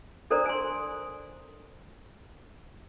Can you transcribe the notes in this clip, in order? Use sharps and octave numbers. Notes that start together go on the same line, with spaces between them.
D4 A4 A#4 C5 D5 A#5
G#5 C6